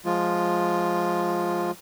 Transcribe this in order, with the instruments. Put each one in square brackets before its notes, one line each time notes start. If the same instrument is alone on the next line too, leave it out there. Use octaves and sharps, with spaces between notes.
[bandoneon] F3 G#3 F4